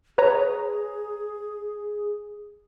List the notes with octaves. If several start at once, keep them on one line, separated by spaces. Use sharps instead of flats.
G#4 B4 C#5 A#5